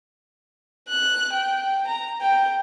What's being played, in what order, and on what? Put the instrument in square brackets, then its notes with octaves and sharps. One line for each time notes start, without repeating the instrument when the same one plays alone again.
[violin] F#6
G5
A#5
G5